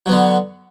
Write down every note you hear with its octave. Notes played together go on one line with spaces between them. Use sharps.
D3 F#3 B3